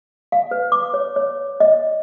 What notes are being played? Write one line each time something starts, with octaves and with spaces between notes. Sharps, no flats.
F5
B4
D6
C#5
C#5
D#5